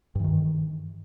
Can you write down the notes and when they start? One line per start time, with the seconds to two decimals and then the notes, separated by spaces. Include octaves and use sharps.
0.15 G2
0.20 E3
0.24 D#3